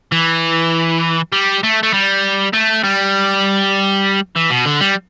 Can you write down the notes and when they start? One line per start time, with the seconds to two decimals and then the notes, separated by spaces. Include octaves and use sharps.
0.12 E3
1.33 G3
1.63 A3
1.83 A3
1.93 G3
2.53 A3
2.84 G3
4.36 E3
4.50 B2
4.65 D3
4.80 G3